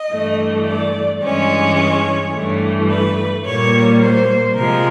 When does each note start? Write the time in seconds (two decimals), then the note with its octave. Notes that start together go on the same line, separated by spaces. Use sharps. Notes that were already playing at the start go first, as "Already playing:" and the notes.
Already playing: D#5
0.12 G2 E3 A3
0.67 D5
1.23 G2 E3 G#3 C#4 C#5
2.34 G2 E3 A3
2.89 B4
3.45 A#2 G3 A#3 C#5
4.01 C5
4.55 C3 F3 G#3 A#4